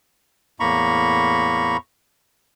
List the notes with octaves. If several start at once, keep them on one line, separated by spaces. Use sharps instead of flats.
E2 A2 A#3 A#5 B5 C#6